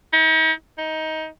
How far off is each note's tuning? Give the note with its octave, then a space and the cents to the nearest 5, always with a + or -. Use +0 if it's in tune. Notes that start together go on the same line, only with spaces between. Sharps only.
D#4 +45
D#4 +20